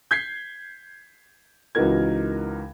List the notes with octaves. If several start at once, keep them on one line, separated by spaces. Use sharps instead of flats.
G6 G#6 B6 C7
C#2 E3 D#4 F#4 A#4 G#6